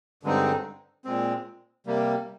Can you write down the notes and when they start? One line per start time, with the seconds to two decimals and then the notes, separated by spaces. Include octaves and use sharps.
0.23 G2 D3 G#3 C4 D#4
1.05 A#2 G#3 C4
1.86 C3 G3 A#3